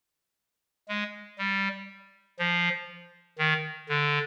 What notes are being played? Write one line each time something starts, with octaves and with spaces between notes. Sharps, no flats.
G#3
G3
F3
D#3
D3